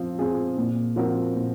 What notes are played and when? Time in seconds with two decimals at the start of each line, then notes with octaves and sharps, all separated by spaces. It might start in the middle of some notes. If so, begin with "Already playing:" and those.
Already playing: F3 C4
0.19 C4 F4 G#4
0.57 A#2
0.96 F3 C4 F#4 A#4
1.34 A#2